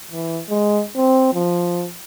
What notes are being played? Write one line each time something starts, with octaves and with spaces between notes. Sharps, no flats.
E3
G#3
C4
F3